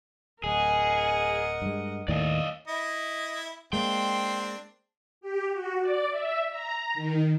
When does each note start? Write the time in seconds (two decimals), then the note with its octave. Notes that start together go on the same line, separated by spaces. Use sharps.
0.44 D1 G#4 A#4 D#5 F#5
1.62 G2 G#3
2.08 D#2 A2 D#3 D5 D#5 F5
2.68 E4 D#5
3.73 G#3 A#3 C4 D4 G5 C6
5.21 G4
5.52 F#4
5.81 D5
6.10 E5
6.51 A#5
6.94 D#3